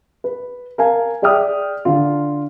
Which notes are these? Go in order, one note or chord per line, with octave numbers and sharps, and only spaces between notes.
B4
A#4 F5 G#5 A5
G#4 D5 E5 G5 D#6 F6
D3 F4